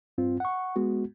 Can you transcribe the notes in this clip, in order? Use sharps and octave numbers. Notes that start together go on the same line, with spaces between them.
G2 C4 F4
F#5 C#6
G#3 B3 F#4